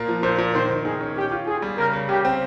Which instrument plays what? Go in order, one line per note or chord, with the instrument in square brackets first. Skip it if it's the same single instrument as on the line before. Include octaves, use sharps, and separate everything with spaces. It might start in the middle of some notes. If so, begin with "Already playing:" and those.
Already playing: [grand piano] A#2 A#3
F3
[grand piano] A#2 [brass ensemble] C5
[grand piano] A#2
[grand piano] D#3 [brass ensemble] C5
[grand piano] D#3
[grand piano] D#3 [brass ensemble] G#4
[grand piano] C#4
[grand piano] C#4 [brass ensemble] G4
[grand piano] F4
[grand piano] F4 [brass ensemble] G#4
[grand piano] G3
[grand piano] C#3 [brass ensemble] A#4
[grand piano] C#3
[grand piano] C#3 [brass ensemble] G4
[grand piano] C4